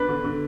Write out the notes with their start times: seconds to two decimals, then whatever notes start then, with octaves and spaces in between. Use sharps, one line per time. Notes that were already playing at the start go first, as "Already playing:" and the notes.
Already playing: B3 D4 B4
0.08 D3
0.24 D3